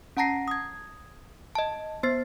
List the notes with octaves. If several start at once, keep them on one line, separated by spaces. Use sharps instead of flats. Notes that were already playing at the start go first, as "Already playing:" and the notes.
C#4 F#5 A5 A#5 A#6 C7
D#6 G#6
D#5 A5
B3 C5 A6 C7